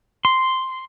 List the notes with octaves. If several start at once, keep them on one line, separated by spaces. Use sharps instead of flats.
C6